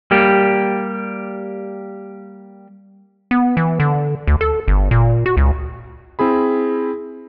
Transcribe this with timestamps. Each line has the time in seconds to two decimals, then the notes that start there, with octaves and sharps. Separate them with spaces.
0.11 G3 A#3 G4
3.31 B3
3.57 E3
3.80 D3
4.27 D2
4.41 A4
4.68 G1
4.91 A#2
5.26 F#4
5.37 C#2
6.19 C4 E4 G#4 B5